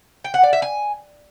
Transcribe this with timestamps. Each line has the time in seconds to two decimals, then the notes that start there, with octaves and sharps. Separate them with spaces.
0.24 G5
0.34 F#5
0.43 D5
0.53 E5
0.62 G#5